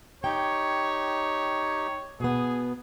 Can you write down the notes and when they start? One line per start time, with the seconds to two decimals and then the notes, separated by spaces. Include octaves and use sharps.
0.24 D#4 G4 C#5 G5
2.20 B2 B3 G#4